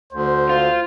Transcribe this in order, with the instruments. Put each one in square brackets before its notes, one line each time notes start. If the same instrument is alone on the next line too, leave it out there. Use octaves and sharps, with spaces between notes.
[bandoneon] D2 [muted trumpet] C5
[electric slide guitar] F4